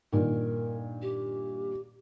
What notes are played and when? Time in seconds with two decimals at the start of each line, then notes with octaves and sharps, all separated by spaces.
0.13 G2 A#2 D#3 A#4
1.02 G4